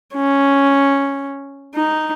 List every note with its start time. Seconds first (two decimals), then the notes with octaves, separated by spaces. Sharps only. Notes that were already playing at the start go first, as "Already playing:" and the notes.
0.14 C#4
1.75 D#4